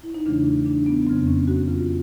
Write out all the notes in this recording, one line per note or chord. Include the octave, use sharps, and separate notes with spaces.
E4
D#4
E2 C#3 E3 A3 D4
D4
B3
F2 C#3 F#3 C4
C#4
F#4
F4